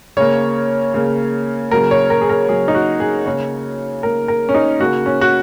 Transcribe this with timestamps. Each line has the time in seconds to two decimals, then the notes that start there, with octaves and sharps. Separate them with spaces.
0.17 C#3 A#3 C#5
0.94 C#3 A#3
1.71 C#3 F#3 A#3 A#4
1.91 C#5
2.10 A#4
2.21 G#4
2.29 A#4
2.49 C#3 F#3 A#3 G#4
2.68 D#4
2.74 F#4
3.00 G#4
3.25 C#3 A#3 C#5
4.03 C#3 A#3 A#4
4.28 A#4
4.49 C#4
4.55 D#4
4.80 C#3 A#3 F#4
5.06 C#4
5.21 F#4